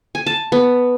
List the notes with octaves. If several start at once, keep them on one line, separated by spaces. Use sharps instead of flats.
G#5
A5
B3